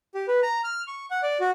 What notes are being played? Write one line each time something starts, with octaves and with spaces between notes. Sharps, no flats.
G4
B4
A#5
F6
C#6
F#5
D5
F#4